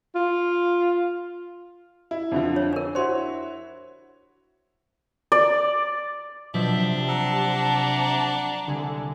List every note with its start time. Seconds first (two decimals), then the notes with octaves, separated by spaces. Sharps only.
0.15 F4
2.11 E4
2.32 F2 D3 F3
2.56 C#5
2.73 D4 A#4
2.95 E4 F#4 C5 C#5 C6
5.32 D5
6.54 B2 F3 F#3 D4 E5 G6
6.76 C3
7.08 D5 F#5 A5 A#5 E6 C7
8.67 C2 D3 G#5